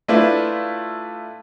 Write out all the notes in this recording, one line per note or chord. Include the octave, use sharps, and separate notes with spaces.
A3 D4 E4 F4 B4